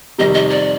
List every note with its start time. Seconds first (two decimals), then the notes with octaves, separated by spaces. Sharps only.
0.18 F2 C3 D#3 G3 D#5
0.35 D#5
0.50 D5